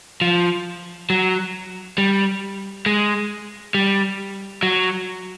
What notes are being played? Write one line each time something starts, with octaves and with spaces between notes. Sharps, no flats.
F3
F#3
G3
G#3
G3
F#3